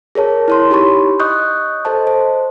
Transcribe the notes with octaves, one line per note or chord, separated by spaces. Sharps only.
G#4 A#4 C#5 A5
E4 C#5 C6
D#4 G4 C#5 B5 C#6
D#5 C#6 D#6 F#6 G6
A4 C5 D#5 A5
C5